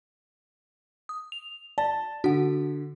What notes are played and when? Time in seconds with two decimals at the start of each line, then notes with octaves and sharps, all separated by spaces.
1.09 D#6
1.32 F7
1.78 D5 A5
2.24 D3 F#4 F#5